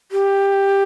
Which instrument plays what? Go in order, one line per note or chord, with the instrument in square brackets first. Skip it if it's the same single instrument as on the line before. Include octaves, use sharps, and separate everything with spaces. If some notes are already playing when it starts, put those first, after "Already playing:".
[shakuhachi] G4